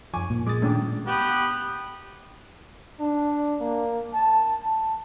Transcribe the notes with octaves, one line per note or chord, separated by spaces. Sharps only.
F#2 F3 G#5 C#6 D6
A#2
G#3 D6 D#6 A6
G#2 D#3 A3 C#4 D4 D6
B3 G4
D4
A#3
A5
A5